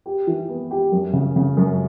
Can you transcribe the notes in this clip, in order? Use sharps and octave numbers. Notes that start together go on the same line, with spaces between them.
G4
E3
B3
G4
F#2
C#3
C#3
F#2